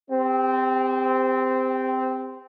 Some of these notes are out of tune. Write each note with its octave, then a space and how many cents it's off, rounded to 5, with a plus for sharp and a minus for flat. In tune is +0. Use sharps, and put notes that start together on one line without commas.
C4 -15 G4 +35